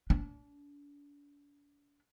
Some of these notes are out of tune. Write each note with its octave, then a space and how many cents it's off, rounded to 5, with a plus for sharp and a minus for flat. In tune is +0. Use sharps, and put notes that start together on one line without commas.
D4 -35